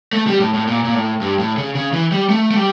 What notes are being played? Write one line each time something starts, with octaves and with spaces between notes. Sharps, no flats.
A3
G3
A2
A2
A#2
A#2
A2
G2
A2
C#3
C#3
E3
G3
A3
A3
G3